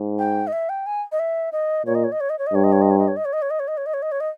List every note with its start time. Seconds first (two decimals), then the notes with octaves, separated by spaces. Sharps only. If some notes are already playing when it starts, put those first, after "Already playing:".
Already playing: G#2
0.19 G5
0.47 D#5
0.53 E5
0.69 G5
0.86 G#5
1.12 D#5
1.19 E5
1.52 D#5
1.86 A#2 C#5
1.95 D#5
2.04 C#5
2.12 D#5
2.21 C#5
2.30 D#5
2.39 C#5
2.47 D#5
2.54 G2 C#5
2.64 D#5
2.72 C#5
2.82 D#5
2.91 C#5
2.98 D#5
3.08 C#5
3.17 D#5
3.25 C#5
3.33 D#5
3.42 C#5
3.50 D#5
3.60 C#5
3.68 D#5
3.77 C#5
3.86 D#5
3.94 C#5
4.02 D#5
4.12 C#5
4.20 D#5